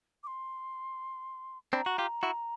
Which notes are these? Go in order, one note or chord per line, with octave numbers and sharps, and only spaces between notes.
D6
C6
C4 D4 B5
A#5
F#4
F4 G4
E4 F#4